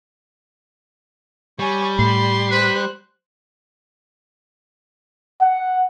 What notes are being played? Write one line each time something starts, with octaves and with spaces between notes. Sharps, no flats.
G3 C#5 G#5
A2 B5 C6
B4 C5 F#6
F#5